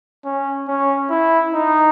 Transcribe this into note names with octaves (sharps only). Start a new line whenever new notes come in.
C#4
C#4
E4
D#4